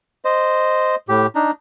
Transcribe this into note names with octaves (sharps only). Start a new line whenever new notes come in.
C5 D#5
A2 G4
D4 D#4